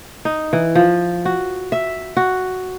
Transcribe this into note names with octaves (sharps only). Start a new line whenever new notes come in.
D#4
E3
F3
F#4
E5
F#4